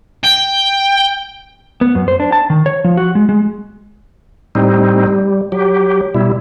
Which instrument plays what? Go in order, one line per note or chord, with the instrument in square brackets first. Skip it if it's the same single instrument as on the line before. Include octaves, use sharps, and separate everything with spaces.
[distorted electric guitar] G5
[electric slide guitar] B3
F#2
C5
D4
A5
D#3
C#5
F3
F#4
G#3
G#3
[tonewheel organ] A2 G3 C4 D#4
G3
F#3 G4
B2 G3 E4